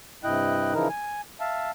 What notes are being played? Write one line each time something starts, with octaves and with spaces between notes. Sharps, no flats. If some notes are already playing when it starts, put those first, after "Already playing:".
G2 C3 E4 D#5 G5 F#6
C#3 E3 F3 D#4 E4 A#4
G#5
E5 F5 A5